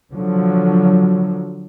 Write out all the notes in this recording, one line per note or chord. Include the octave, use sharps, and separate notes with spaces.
D3 F3 F#3